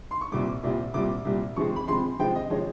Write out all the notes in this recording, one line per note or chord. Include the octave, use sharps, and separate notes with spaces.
C6
C#6
C2 A#2 G3 D6
C2 A#2 G3
C2 A#2 G3 D6
C2 A#2 G3
C3 F3 G#3 C4 C#6
B5
C3 F3 G#3 C4 C6
C3 F3 G#3 C4 G5
D#5
C3 F3 G#3 C4 C#5